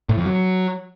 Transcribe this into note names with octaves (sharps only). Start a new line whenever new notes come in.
A2
F2
F#3